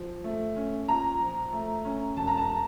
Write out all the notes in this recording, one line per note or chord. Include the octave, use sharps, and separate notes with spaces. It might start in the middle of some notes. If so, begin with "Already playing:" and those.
Already playing: F3
A3
C#4
A#2 A#5
F3
A3
C#4
E1 A5
A#5
A5